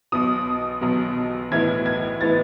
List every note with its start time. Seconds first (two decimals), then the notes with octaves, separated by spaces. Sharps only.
0.12 B1 B2 F#3 D#6
0.81 B1 B2 F#3
1.51 B1 A2 E3 B3 E4 G#6
1.86 G#6
2.21 A2 E3 B3 E4 A6